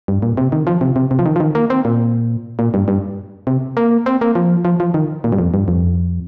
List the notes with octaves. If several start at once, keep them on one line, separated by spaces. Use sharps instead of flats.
G2
A#2
C3
D#3
F3
C3
C3
C3
F3
D#3
F3
D#3
A#3
C4
A#2
A#2
G2
G2
C3
A#3
C4
A#3
F3
F3
F3
D#3
A#2
G2
F2
G2
F2